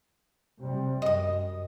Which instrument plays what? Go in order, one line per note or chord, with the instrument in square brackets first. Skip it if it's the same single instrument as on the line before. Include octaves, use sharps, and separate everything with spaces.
[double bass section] C3 G3
[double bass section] F#2 [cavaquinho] D#5 D#6